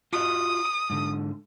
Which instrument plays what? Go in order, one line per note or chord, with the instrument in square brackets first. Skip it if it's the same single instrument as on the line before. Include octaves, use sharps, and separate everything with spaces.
[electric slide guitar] F4 F#4 D#5 [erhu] D#6
[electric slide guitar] G#2 D3